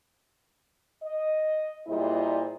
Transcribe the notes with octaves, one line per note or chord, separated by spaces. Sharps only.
D#5
A#2 G3 E4 G#4 C5 D#5